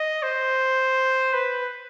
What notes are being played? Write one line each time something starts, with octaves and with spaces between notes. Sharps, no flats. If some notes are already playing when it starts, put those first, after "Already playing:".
Already playing: D#5
C5
B4